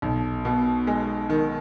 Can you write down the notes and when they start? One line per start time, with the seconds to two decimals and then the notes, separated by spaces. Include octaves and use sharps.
0.02 B1
0.45 B2
0.87 G#3
1.30 D#3